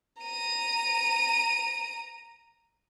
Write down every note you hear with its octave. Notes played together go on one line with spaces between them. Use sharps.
A#5 D#7